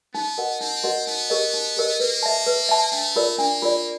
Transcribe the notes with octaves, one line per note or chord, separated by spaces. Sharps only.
B3 D#4
F#4 A#4 D#5 F#5
C4 D#4
F#4 A#4 D#5 F#5
B3 D#4
G4 A#4 D#5
D#4
G4 A#4 D#5
A#3 B4
E5 A5
B4
E5 A5
A3 D4
F4 A#4 D5
A#3 D4
F4 A#4 D5